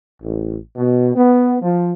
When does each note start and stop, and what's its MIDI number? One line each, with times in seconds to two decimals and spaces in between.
0.21 0.55 33
0.76 1.11 47
1.14 1.57 59
1.62 1.91 53